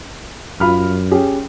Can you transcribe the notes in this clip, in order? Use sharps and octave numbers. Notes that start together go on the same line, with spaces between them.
F#2 F4 B5 F6
C#4 G4 G#4